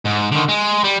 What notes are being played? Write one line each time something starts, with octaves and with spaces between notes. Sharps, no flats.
G#2
D3 D#3
G#3
G3